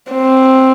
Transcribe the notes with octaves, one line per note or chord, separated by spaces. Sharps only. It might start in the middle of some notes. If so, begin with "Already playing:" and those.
C4